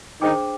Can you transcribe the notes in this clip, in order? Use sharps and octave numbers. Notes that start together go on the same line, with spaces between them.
D#3 D4 D#4 G#4 C5 G5 D6